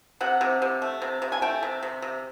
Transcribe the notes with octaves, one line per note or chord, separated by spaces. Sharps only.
C3 F#5
C3
C3
A3
C3
C3
G#5
A3 G5
C3
C3
C3